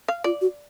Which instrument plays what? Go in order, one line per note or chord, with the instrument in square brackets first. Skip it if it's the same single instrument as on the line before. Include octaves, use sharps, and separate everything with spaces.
[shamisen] F5
[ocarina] F4 [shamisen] D5
[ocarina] F#4